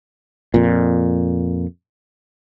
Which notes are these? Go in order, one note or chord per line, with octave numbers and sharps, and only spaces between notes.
F2 A#2